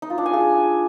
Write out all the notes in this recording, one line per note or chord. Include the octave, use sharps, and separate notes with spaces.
D#4
F4
D4
G#5
G#4